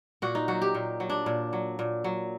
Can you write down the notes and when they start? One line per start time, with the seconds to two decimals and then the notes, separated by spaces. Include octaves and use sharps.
0.22 A#2 F#4
0.35 D#4
0.48 F#3 F#4
0.62 G4
0.74 A#2
1.00 F#3
1.10 D4
1.26 A#2
1.53 F#3
1.79 A#2
2.04 F#3